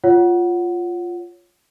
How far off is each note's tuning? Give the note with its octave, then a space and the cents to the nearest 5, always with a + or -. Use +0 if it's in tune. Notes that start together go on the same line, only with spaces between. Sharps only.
F4 +0 C#5 +0 F#5 +0